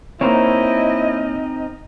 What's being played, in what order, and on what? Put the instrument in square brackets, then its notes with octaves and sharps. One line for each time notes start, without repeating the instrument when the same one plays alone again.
[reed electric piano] A#3 C5 C#5 [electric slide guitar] C4 D#4 A#4 [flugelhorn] E4 [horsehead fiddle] D#5